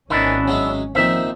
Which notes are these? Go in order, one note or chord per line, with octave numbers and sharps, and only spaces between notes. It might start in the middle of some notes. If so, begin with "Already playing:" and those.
G#1 D#3 B3 C#4 D4 E4
F#3 G#3 E5
A#2 D#3 F3 C4 E5